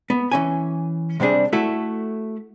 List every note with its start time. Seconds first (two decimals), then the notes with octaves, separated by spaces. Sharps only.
0.10 B3
0.31 E3 C#4 G#5
1.20 C3 G3 C4 D4 G#4
1.53 A3 E4 F#4 A4